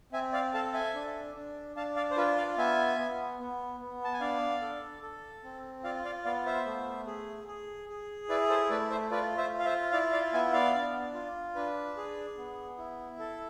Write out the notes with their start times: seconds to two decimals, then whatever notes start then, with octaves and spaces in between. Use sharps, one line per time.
0.12 C4 E5 G#5
0.33 D5 F5
0.54 A4 F5 A5
0.74 E5 G#5
0.95 D4
1.36 D4
1.76 D4 F5 A5
1.96 D5 F5
2.11 C5
2.17 F4 B4
2.37 D5 F5
2.58 B3 E5 G#5
2.98 B3
3.40 B3
3.80 B3
4.04 A5
4.13 G#5
4.21 D4 D5 F5
4.62 A4
5.03 A4
5.44 C4
5.84 F4 D5 F5
6.05 D5 F5
6.25 B3 D5 F5
6.46 C5 E5
6.66 A3
7.07 G#4
7.48 G#4
7.89 G#4
8.29 E4 B4 D5
8.49 A4 C5
8.70 A3 B4 D5
8.90 C5 E5
9.11 F4 B4 D5
9.38 C5 E5
9.52 F4
9.60 F5
9.65 C5 E5
9.92 E4 D5 F5
10.13 D5 F5
10.33 B3 E5 G#5
10.53 D5 F5
10.75 D4
11.15 F4
11.55 D4 B4
11.97 G#4
12.38 B3
12.78 E4
13.19 A4